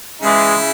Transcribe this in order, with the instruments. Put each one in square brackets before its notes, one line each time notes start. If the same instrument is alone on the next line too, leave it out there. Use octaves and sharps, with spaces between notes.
[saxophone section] C#3 E3 G#3 [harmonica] E4
[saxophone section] C#3